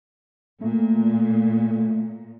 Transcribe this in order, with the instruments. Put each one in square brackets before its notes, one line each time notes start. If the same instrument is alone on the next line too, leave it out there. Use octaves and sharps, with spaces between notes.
[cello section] A#2 [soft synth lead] A3